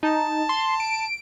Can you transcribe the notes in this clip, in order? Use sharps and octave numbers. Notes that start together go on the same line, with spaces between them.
D#4 A5
C6
D7